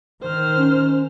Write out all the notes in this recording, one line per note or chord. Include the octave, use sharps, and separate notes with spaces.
D#3 C5 F6
C#4